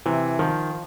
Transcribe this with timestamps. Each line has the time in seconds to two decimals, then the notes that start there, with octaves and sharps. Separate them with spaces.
0.06 C3 E3
0.39 D#3 F3